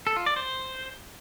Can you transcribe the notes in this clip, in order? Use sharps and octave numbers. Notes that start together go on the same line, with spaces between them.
A4
F4
D5
C5